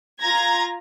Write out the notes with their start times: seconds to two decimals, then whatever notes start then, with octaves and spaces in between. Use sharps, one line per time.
0.21 F4 A#5 G#6 A#6